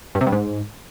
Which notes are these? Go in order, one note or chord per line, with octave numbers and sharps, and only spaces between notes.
G2
C3
G2
G#2